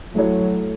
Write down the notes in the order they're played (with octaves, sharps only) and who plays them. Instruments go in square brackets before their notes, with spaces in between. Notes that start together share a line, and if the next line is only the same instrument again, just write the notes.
[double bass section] F#3 [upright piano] A3 E4 A4 C#5